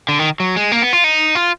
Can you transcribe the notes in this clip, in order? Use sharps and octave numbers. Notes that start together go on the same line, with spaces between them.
D3
D#3
F#3
G#3
A#3
B3
F4
D#4
F4